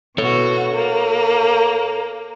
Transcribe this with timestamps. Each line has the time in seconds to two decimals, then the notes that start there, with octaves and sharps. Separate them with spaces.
0.18 B2 F#4 A4 C#5
0.72 A#3